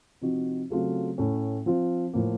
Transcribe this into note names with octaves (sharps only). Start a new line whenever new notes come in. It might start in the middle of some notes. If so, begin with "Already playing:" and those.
C3 F3 C4 D#4 F#4
C#3 F#3 A3 C4 F4
A2 A3 C#4
F3 C4 F4
A2 F3 A#3